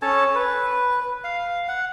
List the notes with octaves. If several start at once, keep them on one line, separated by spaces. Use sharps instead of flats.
C#4 A4 C#5 A5
B4
F5
F#5